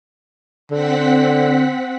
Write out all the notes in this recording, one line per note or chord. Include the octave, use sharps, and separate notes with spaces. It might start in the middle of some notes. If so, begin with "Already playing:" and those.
D3 C4 F#5 B6